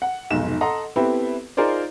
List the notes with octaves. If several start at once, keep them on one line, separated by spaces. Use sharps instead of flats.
F#5
F1 B1 G#2 E7
A4 D#5 F#5 A#5 C6
B3 C4 E4 G4 A4 B4
D#4 F4 G#4 A#4 C5 D5